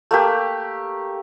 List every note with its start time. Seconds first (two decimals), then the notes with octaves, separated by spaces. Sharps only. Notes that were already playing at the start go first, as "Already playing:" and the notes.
0.11 A3 A#3 G4